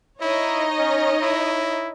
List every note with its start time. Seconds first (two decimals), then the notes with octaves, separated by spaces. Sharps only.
0.22 D#4 E4 C#5 D#5
0.79 C#4
1.22 E4